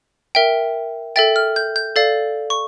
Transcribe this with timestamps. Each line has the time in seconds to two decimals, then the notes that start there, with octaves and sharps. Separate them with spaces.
0.35 A#4 E5 G5
1.16 A4 E5 G5 A6
1.36 F6
1.56 G6
1.76 G6
1.96 A4 D5 F5 A6
2.50 C#6